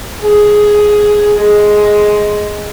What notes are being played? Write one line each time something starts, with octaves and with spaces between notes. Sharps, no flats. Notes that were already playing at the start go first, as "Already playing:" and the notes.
G#4
G#3